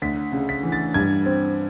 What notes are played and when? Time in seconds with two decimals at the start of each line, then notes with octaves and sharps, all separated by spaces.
0.02 D2 B6
0.32 C#3
0.49 B6
0.63 E3
0.72 A6
0.94 G2 G#6
1.26 C4